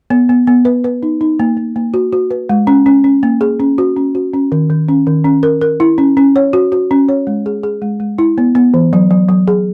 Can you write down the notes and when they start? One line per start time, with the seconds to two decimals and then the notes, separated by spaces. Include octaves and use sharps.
0.10 B3
0.29 B3
0.47 B3
0.65 B4
0.84 B4
1.03 D#4
1.21 D#4
1.40 A#3
1.57 A#3
1.76 A#3
1.94 F#4
2.13 F#4
2.31 B4
2.49 G#3
2.67 C#4
2.86 C#4
3.04 C#4
3.23 A#3
3.41 G#4
3.60 C#4
3.78 F#4
3.97 C#4
4.15 F#4
4.34 C#4
4.52 D#3
4.70 D#3
4.88 C#4
5.07 D#3
5.25 C#4
5.43 A#4
5.61 A#4
5.80 E4
5.98 C#4
6.17 C#4
6.36 C#5
6.53 F#4
6.72 F#4
6.91 C#4
7.09 C#5
7.27 G#3
7.46 G#4
7.63 G#4
7.82 G#3
8.00 G#3
8.18 E4
8.38 B3
8.55 B3
8.74 E3
8.93 F#3
9.11 F#3
9.29 F#3
9.48 G#4